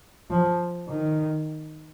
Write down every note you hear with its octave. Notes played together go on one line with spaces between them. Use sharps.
F3
D#3